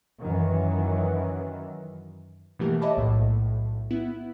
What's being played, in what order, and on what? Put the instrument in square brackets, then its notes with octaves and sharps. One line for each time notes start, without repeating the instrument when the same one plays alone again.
[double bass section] F#2 D#3 E3
[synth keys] B2 E3 A3 A#3 G4 A#4
C#5 D#5 E5 A5 B5 D6
B1 A2
B3 E4